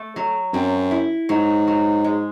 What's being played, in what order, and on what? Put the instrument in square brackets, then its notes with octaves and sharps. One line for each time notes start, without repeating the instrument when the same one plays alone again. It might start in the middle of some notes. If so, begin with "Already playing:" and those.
Already playing: [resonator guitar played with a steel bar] A3
F#3
[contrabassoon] F#2 [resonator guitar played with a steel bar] C4
[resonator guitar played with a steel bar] E4
[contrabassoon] G#2 [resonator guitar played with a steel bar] F#3
[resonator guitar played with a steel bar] F#3
G#3